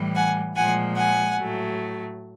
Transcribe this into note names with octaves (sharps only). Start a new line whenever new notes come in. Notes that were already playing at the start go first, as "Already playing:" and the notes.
Already playing: A2 E3 G3
F#5 G#5
A#2 F3 G#3 F#5 G#5
F#5 G#5
A2 F#3 A3